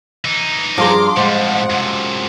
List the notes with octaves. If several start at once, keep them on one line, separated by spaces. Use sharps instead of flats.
E3 D#4
G2 F3 G#4 A#5 C6 D6
A2 G3 G#3 C4 F#5
F#2 C3